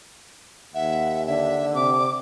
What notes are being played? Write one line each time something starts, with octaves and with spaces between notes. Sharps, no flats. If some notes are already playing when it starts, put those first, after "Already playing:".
D#2 E5 F#5
D3 E5
C3 D6